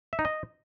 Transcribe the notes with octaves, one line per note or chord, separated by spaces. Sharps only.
E5
D#4
D#5